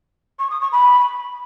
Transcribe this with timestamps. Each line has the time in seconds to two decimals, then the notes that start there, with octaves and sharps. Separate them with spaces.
0.39 C#6
0.50 D#6
0.61 C#6
0.72 B5